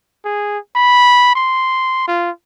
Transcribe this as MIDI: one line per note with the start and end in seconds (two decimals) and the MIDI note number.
0.25 0.58 68
0.76 1.35 83
1.35 2.04 84
2.08 2.30 65